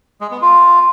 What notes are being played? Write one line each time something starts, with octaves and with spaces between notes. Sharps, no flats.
G#3
B3
F4